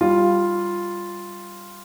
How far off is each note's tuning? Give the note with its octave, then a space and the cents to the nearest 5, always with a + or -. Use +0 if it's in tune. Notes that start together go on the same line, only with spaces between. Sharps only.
G3 +0 F4 +0